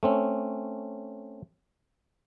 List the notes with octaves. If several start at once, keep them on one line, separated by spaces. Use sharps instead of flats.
A3 C4 C#4